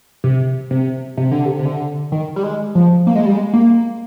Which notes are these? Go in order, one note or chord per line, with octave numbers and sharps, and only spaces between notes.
C3
C3
C3
D3
C3
C3
D3
D#3
G3
G#3
F3
A#3
G#3
G3
G#3
A#3